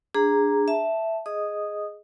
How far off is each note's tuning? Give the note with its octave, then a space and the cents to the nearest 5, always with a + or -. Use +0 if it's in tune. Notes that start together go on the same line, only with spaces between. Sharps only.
D4 +0 G#4 -15 A#5 +0
E5 +0 A5 +0
G#4 +0 D#5 +0 D#6 -5